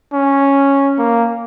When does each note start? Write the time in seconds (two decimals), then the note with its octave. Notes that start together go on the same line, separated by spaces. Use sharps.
0.13 C#4
0.98 A#3